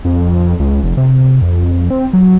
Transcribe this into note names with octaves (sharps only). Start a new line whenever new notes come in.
F2
C#2
F1
C3
F2
C4
F#3